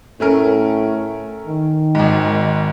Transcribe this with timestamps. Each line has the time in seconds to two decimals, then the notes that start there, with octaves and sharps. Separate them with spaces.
0.20 A2 A3 C#4 A#4
1.47 D#3
1.95 G#1 G#2